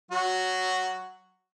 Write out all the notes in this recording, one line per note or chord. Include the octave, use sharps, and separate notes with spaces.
F#3 F#4